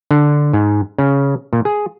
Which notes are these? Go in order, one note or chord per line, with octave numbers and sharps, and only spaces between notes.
D3
G#2
C#3
A#2
G#4